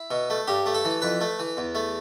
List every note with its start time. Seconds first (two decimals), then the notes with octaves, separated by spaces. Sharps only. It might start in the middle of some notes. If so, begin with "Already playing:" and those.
Already playing: E4
0.11 B2
0.30 A3
0.47 G2 G4
0.66 A3
0.74 A4
0.85 E3
1.02 F2 B4
1.21 A3
1.39 E3
1.57 E2
1.75 A3